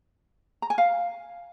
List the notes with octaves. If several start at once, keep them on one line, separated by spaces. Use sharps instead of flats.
A#5
G#5
F5